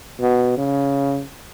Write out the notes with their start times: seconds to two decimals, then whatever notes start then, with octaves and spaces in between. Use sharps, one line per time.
0.21 B2
0.57 C#3